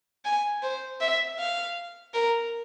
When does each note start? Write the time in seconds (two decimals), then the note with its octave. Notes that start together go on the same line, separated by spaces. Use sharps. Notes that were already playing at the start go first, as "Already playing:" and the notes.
0.25 G#5
0.63 C5
1.01 E5
1.38 F5
2.14 A#4